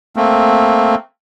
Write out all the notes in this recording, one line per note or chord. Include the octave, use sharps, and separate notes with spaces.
A3 A#3 C4